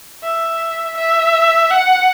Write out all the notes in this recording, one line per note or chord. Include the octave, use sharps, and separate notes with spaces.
E5
E5
F#5